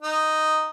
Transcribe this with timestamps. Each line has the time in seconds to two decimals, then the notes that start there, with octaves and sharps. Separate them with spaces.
0.02 D#4